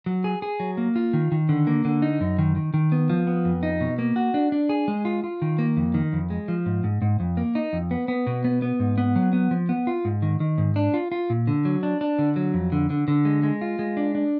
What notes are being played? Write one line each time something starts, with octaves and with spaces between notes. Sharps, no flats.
F#3
G#4
G#4
F#3
A#3
F4
D#3
D#3
D3
A#3
D3
D#4
F#2
D#3
D#3
D#3
B3
F3
B3
F2
D#4
B2
A#3
F#4
D4
D4
G#4
G#3
F4
F4
D#3
A#3
F2
D#3
F2
G#3
F3
G#2
G#2
G#2
F2
A#3
D#4
F2
B3
B3
B2
B3
B3
G#2
B3
F#3
B3
F3
B3
F4
G#2
D#3
D#3
G#2
D4
F4
F4
A#2
D3
F#3
D4
D4
D3
F#3
F2
D3
D3
D3
G#3
G#3
F4
G#3
D4
D4